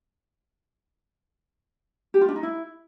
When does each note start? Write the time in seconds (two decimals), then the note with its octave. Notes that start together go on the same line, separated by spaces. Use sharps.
2.14 G4
2.21 F4
2.29 D4
2.36 D#4
2.43 E4